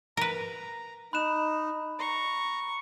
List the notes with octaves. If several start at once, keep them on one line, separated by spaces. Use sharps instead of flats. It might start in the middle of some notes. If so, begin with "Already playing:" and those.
A#4 B4 A#5
D#4 B5 F#6 E7
A#5 C#6